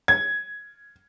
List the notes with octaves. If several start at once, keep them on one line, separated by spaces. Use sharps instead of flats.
G#6